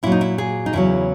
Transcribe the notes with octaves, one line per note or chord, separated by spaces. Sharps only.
A#2 F#3 E4
D#4
E4
G#4
D#4
E2 C#3 F#3 E4